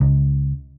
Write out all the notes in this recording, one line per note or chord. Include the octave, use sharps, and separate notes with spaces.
C#2